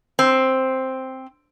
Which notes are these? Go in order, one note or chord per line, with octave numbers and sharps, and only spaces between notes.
C4